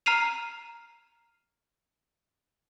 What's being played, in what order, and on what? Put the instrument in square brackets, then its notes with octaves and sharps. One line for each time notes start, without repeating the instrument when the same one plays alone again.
[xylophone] A#5 F6 C7 D#7 F7